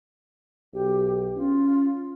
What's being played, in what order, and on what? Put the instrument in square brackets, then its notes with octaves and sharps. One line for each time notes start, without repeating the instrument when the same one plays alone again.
[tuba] B1 [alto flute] G4
[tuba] C#4 [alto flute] F4